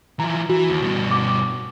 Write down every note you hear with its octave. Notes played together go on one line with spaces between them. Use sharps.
E3 F3 A#5
E3 F#4
D#2
G2 B2
D6